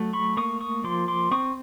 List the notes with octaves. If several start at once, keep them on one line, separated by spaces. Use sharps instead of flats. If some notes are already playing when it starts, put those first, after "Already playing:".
Already playing: F#3 A3
B5 C#6
A#3 C#6 D#6
C#6 D#6
F3 C6 D6
C6 D6
C4 C#6 D#6